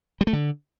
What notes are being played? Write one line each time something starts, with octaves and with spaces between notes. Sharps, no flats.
G3
A3
D3